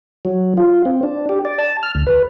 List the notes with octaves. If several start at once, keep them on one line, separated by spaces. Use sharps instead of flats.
F#3
F4
C4
D4
G4
D5
A5
F6
D2
B4